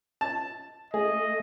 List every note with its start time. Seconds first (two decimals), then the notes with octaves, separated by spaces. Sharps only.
0.21 A5
0.94 A3 G#4 D#5